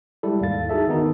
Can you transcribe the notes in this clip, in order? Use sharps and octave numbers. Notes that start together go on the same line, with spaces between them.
G3 G#3 E4 A4
D#2 G#2 F5 A6
D#4 F#4 G#4 A4 E5
D#3 B3 D#4 A#4